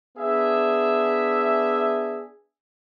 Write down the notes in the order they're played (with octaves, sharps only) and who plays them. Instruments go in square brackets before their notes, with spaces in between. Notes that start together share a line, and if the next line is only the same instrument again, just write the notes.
[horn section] B3 D4 G#4 E5